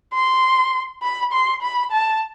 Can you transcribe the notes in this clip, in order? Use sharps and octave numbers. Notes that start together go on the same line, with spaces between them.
C6
B5
C6
B5
A5